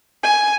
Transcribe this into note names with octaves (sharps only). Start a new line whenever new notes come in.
G#5